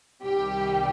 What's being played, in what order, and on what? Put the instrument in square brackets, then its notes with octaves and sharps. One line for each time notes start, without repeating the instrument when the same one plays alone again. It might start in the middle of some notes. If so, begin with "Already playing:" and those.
[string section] C2 C3 D#3 G3 G4